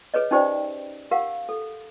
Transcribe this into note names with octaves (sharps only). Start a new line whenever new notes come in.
G#4 B4 C#5 D#5
C#4 D#4 G4 C5 D5 G5
G4 A#4 F5 F#5
A4